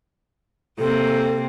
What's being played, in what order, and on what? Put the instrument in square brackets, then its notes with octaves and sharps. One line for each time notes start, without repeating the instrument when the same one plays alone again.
[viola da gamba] C3 A#3 C4 [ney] A4